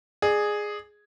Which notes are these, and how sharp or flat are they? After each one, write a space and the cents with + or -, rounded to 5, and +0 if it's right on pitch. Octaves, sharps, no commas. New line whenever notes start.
G#4 +0 D5 +35